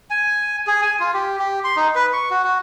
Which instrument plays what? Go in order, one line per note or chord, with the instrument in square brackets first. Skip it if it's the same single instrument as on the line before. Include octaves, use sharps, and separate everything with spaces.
[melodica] G#5
G#4
G#5
F4
G4
G4
C6
D#4
B4
C#6
F#4
F#4